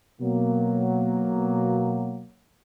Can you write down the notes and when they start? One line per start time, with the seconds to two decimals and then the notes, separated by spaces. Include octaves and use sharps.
0.21 B2 F#3 A#3